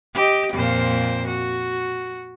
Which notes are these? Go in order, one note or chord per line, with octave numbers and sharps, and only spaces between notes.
G4 D#5
F2 A#2 C5
F#4